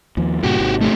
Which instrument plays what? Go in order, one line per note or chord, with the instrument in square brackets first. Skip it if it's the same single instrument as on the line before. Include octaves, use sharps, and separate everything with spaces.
[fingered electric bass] D#2 F3
[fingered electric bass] G2 A#2 C#3 [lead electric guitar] F#4 G4
[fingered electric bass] G#1 C3 D#3
[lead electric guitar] A3 G4